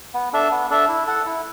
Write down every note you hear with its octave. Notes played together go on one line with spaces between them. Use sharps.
B3
D4 A4 E5
B3
D4 A4 E5
E4
A4 F#5
E4